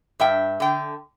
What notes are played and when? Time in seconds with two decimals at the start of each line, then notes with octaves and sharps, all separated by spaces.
0.20 G2 E5 G5
0.60 D3 G5